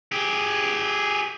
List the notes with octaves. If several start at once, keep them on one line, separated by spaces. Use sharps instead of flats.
G4 G#4